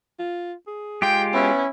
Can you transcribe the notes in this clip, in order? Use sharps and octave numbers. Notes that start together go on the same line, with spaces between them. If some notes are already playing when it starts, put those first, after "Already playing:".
F4
G#4
G#3 F4 G4 G5
B3 C#4 E4